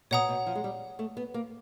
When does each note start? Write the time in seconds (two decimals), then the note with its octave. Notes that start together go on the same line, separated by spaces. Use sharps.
0.11 B2 C#5 F#5 A#5 D#6
0.29 B2
0.46 F3
0.55 G#3
0.64 G3
0.99 A3
1.17 B3
1.34 A#3